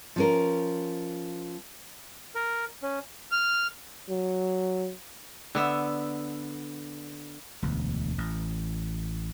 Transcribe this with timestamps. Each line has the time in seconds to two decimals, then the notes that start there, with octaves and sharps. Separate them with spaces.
0.16 F3 C#4 A#4
2.35 A#4
2.82 C#4
3.32 F6
4.09 F#3
5.55 D3 B3 E5
7.63 E1 D2
8.18 A1